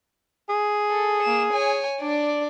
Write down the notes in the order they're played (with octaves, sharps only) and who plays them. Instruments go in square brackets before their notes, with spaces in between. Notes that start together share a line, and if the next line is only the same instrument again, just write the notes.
[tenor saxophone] G#4
[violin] A4
A#3 E7
C#5 G#5
D4 D5